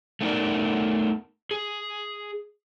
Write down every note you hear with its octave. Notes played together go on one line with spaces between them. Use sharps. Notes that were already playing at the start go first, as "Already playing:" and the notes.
A3 B3 D#4 A#4 D5
G#4